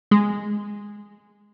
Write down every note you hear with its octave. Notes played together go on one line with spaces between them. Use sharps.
G#3